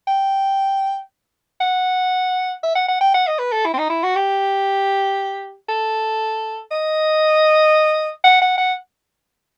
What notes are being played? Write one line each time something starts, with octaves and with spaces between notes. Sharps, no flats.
G5
F#5
E5
F#5
F#5
G5
F#5
D#5
B4
A4
E4
C4
D#4
E4
F#4
G4
A4
D#5
F#5
F#5
F#5